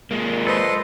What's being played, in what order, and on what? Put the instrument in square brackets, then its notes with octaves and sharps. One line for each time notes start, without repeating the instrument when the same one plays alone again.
[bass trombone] A#2 [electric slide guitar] G#3 A#3
[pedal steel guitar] A4 D#5 [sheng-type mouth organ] B4 C5